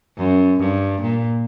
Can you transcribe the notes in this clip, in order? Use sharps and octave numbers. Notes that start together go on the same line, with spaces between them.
F#2
G2
A#2